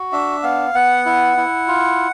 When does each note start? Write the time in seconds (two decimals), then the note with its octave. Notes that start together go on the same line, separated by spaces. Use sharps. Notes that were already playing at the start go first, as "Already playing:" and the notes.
Already playing: F#4
0.12 D4 E5
0.43 B3 F5
0.74 B3 F#5
1.06 E4
1.37 E4
1.68 F4